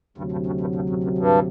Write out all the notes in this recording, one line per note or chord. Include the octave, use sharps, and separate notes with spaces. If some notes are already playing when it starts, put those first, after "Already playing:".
D2 G2 C3 F#3
G2
F#2
G2
G2
F#2
F#2
G2